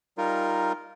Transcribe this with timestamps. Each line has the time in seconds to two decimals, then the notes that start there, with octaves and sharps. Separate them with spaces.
0.18 G3 D#4 F4 A#4